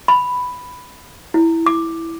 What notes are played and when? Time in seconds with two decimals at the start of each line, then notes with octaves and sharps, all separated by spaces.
0.08 B5
1.34 E4
1.66 D6